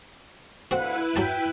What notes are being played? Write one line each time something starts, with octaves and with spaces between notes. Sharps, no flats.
D2 C4 E4 F#4 B4 F5 F#5
F#3 F#4 G5 A5